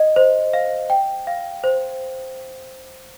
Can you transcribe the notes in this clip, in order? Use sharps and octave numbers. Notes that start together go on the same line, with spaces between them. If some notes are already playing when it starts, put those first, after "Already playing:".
Already playing: D#5
C5
F5
G5
F5
C5